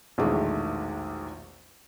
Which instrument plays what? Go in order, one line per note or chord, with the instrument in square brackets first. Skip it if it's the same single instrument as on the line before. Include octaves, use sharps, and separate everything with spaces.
[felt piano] A#1 E2 B2 D#3 G#3 A3